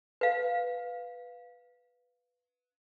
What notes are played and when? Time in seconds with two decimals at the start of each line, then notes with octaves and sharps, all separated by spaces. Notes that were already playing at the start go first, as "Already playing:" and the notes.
0.21 B4 F5